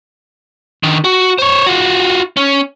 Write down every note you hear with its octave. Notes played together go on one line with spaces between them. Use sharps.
D#3 D4
F#4
C5 C#5
F4 F#4
C#4